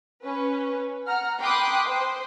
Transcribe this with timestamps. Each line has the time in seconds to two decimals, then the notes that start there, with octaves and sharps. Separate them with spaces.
0.23 C#4 B4
1.06 F#5 A#5 F6
1.39 G5 B5 C6 D6 D#6 F#6
1.86 C5